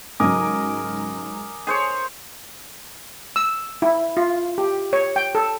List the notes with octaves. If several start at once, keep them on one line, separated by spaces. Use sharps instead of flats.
G#2 C#3 F#3 A#4 G#5 D6 D#6
G#4 C5 C#5
E6
E4
F4
G4
C#5
G5
A4